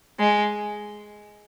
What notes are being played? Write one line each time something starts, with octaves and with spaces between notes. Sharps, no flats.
G#3